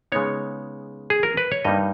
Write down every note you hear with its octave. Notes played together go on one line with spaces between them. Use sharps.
C#3 G#3 B3 D#4 C#5
G#4
A#4
B4
C#5
G2 G3 A#3 D#4 D#5